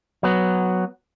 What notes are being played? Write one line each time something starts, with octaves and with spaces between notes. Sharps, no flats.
F#3 B3